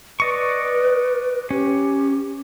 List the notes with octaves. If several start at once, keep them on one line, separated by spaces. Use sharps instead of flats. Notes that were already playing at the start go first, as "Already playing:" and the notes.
B4 D5 D#5 C#6
C#4 G4